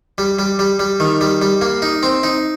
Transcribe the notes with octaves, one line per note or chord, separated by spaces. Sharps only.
G3
G3
G3
G3
D#3
G3
G3
A#3
D#4
C4
D#4